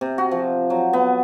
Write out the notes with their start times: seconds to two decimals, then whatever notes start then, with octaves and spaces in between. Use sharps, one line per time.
0.01 C3
0.18 F#4
0.31 F3
0.70 F#3
0.93 B3